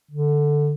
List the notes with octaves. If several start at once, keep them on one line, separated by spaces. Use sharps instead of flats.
D3